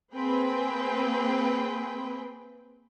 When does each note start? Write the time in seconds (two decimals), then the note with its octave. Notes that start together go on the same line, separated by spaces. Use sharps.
0.14 A#3 C4 G#4 B4 G5